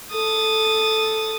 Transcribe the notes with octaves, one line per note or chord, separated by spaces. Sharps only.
A4 D#6 A6